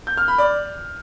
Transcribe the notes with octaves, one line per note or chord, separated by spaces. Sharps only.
G6
F6
B5
D5